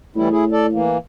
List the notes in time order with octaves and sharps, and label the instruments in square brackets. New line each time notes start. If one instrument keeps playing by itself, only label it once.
[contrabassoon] A2 [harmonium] E3 G3 E4
[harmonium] E4 G#4
A4 D5
E3 A#3